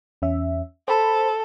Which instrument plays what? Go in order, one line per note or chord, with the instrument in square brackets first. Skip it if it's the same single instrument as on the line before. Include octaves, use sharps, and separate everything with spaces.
[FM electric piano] E2 C#4 E5
[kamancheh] A4 [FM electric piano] C5 B5